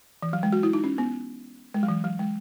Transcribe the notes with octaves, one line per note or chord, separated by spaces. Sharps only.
E3
F#3
G#3
F#4
E4
D#4
C#4
B3
G#3
F#3
E3
F#3
G#3